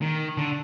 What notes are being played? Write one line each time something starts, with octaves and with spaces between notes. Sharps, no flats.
D#3
D3